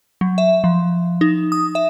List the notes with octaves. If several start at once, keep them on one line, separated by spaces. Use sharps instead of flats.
F#3
E5
F3
D#4
D#6
E5